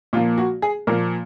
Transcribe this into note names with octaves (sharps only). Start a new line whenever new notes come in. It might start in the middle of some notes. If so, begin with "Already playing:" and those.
A#2 F3 A#3 F4
F#4
G#4
A#2 F3 A#3 A#4